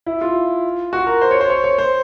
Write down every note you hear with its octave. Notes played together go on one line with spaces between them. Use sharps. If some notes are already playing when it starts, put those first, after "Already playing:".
E4
F4
F#4
A#4
C5
C#5
C5
C#5
C#5
C5